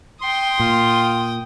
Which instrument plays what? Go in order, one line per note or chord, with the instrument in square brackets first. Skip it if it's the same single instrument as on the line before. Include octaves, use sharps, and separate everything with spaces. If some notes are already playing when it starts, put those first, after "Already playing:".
[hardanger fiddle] G5 D#6 [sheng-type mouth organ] C6
[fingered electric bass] A#2 [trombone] F4